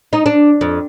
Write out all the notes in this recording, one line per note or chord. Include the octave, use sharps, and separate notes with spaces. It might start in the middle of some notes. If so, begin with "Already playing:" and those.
D#4
D4
F2